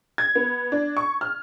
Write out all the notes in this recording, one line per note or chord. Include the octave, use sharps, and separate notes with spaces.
G#6
B3
D4
C#6
F6